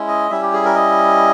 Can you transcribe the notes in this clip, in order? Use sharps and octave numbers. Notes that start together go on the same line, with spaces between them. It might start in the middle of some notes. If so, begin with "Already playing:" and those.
Already playing: G#3 C#4 E4
D#5
G3 C#4 E4 E5
G4
G#4
A#4
D#5